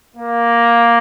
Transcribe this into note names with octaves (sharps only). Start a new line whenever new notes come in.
A#3